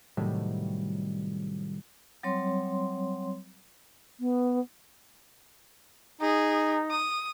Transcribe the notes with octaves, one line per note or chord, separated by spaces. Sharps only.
A2 C3 D#3 F#3 G3 A3
F#3 G3 C4 C#5 C6
B3
D#4 G#4
D#6